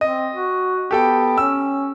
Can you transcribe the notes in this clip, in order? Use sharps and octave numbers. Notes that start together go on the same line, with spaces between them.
C4 D#5
F#4
B3 G4 A4 G5
C#4 E6